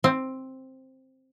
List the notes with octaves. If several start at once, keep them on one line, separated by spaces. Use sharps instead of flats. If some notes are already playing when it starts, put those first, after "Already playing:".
C4